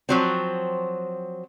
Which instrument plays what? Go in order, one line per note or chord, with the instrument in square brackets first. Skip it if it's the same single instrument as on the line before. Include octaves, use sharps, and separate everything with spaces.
[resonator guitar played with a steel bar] F3 F#3 C4